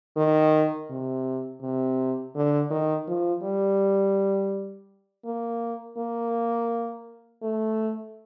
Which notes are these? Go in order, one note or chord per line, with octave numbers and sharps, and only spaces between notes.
D#3
C3
C3
D3
D#3
F3
G3
A#3
A#3
A3